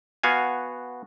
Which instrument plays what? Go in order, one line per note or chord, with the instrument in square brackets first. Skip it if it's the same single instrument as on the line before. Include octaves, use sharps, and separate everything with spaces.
[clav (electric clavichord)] B3 F#4 F5 G#5